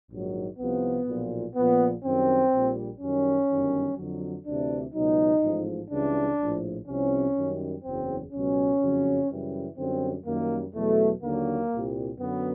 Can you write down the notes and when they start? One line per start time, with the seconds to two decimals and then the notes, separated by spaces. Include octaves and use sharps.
0.10 A#1 G#2 D#3 F#3
0.59 C2 C3 F3 B3
1.07 B1 A#2 F3
1.55 A#1 A#2 F3 B3
2.04 F#2 D#3 G3 C4
2.52 A#1 A#2 G3
3.01 F#2 D#3 G3 C#4
3.49 G1 F#2 D#3 G3
3.98 F2 D3 F#3
4.46 D2 C3 E3 D4
4.94 C#2 B2 F#3 D#4
5.43 A1 G#2 F3
5.91 C#2 C#3 E3 G3 D4
6.39 A#1 A2 F3
6.88 C2 C3 F3 C#4
7.36 F#2 D#3 G3
7.84 F#1 E2 C#3 F#3 C4
8.33 C#2 B2 F#3 C#4
8.81 F#1 F2 C#3 F#3
9.29 F#2 C#3 E3 G3
9.77 F#2 D3 G3 C4
10.26 F#2 D#3 G3 A#3
10.74 E2 B2 F#3 A3
11.23 D#2 D3 F#3 A#3
11.72 C2 A#2 G3
12.20 F#2 D3 F#3 B3